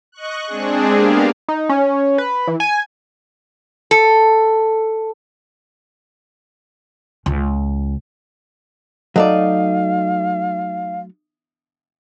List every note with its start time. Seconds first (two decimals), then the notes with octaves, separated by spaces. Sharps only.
0.12 D#5 C#6 F#6
0.47 G#3 C4 D4 G#4
0.93 A#3 B3 D4 G4 F5
1.49 D#4
1.69 C#4
2.18 B4
2.47 E3
2.60 G#5
3.91 A4
7.26 C#2
9.16 F#3 A3 D#4 D5 F5